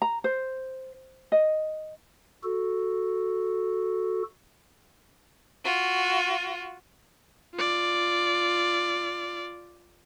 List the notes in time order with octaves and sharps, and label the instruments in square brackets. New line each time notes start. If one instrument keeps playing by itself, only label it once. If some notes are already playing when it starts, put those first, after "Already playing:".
[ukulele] A#5
C5
D#5
[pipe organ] F#4 A4
[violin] F4 F#4
[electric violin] F4 D5